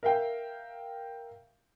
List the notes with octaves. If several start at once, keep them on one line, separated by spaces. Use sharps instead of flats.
A#4 E5 F5 G5